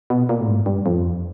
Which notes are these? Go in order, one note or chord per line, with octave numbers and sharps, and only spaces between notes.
B2
A#2
A2
G#2
G2
F2